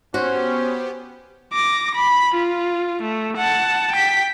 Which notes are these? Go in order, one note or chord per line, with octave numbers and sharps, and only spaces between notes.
B3 C#4 F#4 G4 C5
D6 A#6
B5
F4
A3
F#5 A5
G5 B6